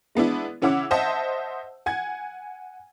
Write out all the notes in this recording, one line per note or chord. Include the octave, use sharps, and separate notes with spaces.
G#3 B3 D4 E4
C#3 C#4 E4 F#5 D6 E6
C5 D#5 E5 F#5 A5
F#5 G#5 G#6